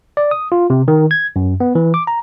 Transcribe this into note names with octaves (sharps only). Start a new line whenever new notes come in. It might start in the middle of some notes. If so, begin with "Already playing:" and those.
D5
D#6
F4
C3
D#3
G#6
F#2
B3
E3
D6
A#5